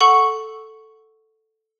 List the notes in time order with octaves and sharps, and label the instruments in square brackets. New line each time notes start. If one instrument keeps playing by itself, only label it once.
[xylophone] A4 F#5 C#6